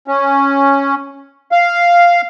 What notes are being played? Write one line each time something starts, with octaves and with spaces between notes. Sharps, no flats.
C#4
F5